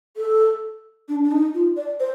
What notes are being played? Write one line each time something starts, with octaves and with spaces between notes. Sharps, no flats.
A4
D4
D4
D#4
F4
D5
C5